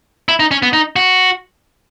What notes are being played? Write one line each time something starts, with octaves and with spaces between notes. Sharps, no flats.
E4
D#4
C#4
B3
D#4
F#4